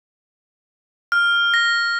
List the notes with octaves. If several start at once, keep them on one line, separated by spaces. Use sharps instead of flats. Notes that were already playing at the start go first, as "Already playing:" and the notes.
F6
A#6